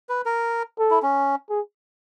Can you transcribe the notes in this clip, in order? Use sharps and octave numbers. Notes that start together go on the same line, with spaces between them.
B4
A#4
A4
E4
C#4
G#4